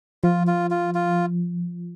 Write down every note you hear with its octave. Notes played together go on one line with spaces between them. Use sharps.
F3 F4
F4
F4
F4